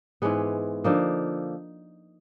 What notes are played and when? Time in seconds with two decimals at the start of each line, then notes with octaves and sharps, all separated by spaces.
0.22 G#2 E3 G#3 B3
0.84 D3 F3 A#3 D#4